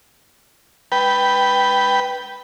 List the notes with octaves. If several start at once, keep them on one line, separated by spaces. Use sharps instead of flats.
B4 G5